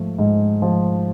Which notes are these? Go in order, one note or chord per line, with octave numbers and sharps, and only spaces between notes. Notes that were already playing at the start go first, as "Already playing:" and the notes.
Already playing: G#2 F3 A3
G#2
F3